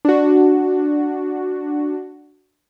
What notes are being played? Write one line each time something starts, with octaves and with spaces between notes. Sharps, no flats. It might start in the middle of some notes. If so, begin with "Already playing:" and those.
D4 F#4